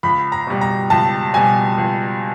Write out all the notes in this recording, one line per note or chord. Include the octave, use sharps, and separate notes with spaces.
C#2 B5
A#5
B2 G3
A#5
C#2 A5
B2 G3 G#5
C#2